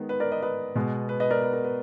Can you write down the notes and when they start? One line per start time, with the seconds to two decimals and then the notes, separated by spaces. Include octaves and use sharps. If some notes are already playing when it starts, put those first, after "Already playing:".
Already playing: D#3 G#3 B3
0.09 B4
0.20 A#4 D5
0.32 B4 D#5
0.42 B4 D#5
0.75 B2 G#3 B3
1.09 B4
1.20 B4 D#5
1.31 A#4 D5
1.42 B4
1.53 A#4
1.64 B4